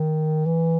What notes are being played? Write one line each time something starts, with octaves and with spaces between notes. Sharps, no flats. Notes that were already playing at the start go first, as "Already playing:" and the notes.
Already playing: D#3
E3